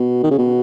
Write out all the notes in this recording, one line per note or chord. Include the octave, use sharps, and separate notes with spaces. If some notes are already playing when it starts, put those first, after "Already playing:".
Already playing: B2
D#3
C#3
B2